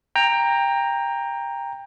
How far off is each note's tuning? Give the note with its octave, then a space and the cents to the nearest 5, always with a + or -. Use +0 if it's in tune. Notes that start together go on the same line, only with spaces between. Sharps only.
G5 +20 A#5 +0